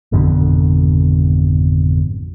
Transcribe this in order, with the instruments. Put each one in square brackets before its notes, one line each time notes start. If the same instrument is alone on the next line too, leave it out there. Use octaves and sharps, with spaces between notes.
[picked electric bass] G#1 F2 B2 D3